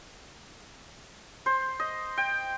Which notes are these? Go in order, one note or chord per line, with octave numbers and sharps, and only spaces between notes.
C5
D#5
G5